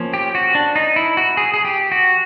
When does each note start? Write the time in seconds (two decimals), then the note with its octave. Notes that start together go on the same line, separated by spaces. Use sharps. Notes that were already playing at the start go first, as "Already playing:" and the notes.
Already playing: F3 A#3 C#4
0.14 G4
0.35 F#4
0.55 D4
0.76 D#4
0.96 E4
1.17 F#4
1.37 G#4
1.54 G#4
1.65 G4
1.92 F#4